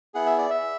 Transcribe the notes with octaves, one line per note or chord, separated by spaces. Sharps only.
B3 E4 G#4 F#5
E5
D5
E5